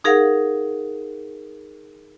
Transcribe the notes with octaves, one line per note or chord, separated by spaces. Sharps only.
D#4 G#4 A#4 F5 F#5